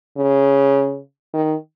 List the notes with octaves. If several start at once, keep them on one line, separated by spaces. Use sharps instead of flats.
C#3
D#3